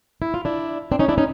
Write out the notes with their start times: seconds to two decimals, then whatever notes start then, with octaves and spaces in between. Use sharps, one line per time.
0.22 E4
0.34 F4
0.45 D4 E4
0.92 C4 D4
0.99 C#4 D#4
1.08 D4 E4
1.18 C#4 D#4